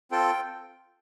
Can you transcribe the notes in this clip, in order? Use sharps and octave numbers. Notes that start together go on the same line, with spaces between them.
C4 F4 A4 G5